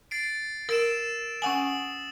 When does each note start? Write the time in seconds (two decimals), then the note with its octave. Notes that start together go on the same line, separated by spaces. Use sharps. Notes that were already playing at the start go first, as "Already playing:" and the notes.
0.11 A6 C7 D7
0.69 A#4 E6 D7 E7
1.42 C#4 F#5 G#5 D#6 F#7